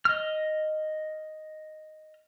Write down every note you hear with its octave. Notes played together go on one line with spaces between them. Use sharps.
D#5 F6